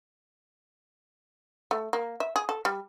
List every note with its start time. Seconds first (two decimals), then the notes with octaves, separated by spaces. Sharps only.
1.71 A3
1.93 A#3
2.20 E5
2.36 G#4
2.49 A4
2.65 G3